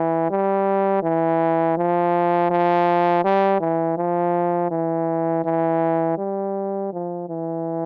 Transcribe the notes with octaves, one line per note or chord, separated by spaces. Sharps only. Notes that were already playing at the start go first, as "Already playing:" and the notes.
Already playing: E3
G3
E3
F3
F3
G3
E3
F3
E3
E3
G3
F3
E3